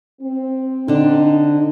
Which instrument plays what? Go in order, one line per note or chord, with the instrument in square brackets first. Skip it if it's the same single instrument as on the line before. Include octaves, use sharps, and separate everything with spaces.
[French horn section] C4
[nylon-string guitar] D3 D4 [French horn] D#4